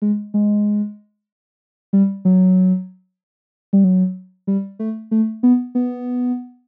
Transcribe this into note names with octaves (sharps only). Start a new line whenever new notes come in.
G#3
G#3
G3
F#3
G3
F#3
G3
A3
A3
B3
B3